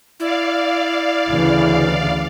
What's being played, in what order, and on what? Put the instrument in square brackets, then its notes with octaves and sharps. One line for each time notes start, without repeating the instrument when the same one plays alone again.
[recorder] E4 [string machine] D5 F5
[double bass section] D2 C#3 E3